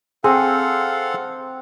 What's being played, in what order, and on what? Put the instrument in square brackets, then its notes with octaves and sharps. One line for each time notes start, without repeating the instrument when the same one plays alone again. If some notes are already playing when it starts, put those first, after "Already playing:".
[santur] C4 [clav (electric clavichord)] G#4 [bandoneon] A4 F5 F#5